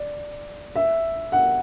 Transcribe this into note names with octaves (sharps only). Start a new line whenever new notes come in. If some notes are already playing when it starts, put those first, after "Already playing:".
Already playing: D5
E5
F#5